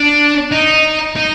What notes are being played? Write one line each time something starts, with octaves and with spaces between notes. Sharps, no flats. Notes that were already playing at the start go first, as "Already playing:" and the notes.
Already playing: D4
D#4
D#4